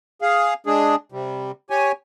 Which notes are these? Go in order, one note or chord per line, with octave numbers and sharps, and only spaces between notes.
G#4 F5
G#3 D4 G#4
C3 G3
G4 C#5 G#5